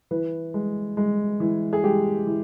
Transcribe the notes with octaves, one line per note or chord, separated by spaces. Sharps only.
E3 B4
G#3
G#3
E3
G#4
G#3 G4
E3